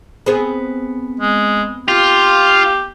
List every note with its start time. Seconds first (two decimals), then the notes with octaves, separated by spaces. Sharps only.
0.26 B3 C4 G#4
1.20 G#3
1.88 F4 G4